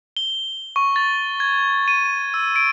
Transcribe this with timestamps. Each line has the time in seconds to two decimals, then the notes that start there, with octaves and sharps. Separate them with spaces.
0.17 G7
0.76 C#6
0.96 A6
1.40 G#6
1.88 D#7
2.34 E6
2.56 D7